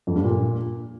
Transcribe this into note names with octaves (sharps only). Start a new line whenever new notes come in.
F2
G2
A#2